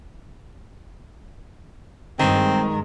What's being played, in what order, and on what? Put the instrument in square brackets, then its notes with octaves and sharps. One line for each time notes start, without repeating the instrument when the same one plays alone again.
[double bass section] G2 G#3 [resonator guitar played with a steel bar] D#3 [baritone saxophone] C4